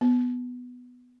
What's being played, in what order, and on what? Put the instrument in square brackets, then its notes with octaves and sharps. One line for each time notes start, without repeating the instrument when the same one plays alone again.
[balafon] B3